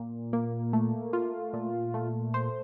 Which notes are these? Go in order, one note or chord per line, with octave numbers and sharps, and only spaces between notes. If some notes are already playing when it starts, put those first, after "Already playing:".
Already playing: A#2
A#3
A3
F4
A#2
A3
C5